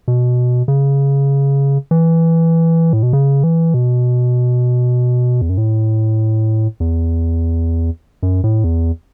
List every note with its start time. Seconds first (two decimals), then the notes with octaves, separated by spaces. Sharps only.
0.08 B2
0.68 C#3
1.91 E3
2.93 A2
3.03 B2
3.13 C#3
3.44 E3
3.74 B2
5.41 E2
5.49 F#2
5.58 A2
6.80 E2
8.23 F#2
8.44 A2
8.64 E2